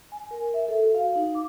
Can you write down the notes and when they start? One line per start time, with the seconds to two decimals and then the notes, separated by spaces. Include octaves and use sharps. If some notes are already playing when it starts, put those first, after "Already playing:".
0.12 G#5
0.31 A#4
0.54 E5
0.68 A4
0.83 F#4
0.95 F5
1.16 D#4
1.35 D6